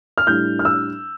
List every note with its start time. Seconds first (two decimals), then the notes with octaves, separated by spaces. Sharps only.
0.18 F6
0.27 A2 G3 D4 G6
0.59 F6
0.65 E6